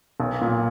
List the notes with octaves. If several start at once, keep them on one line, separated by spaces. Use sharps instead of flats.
B1
A#2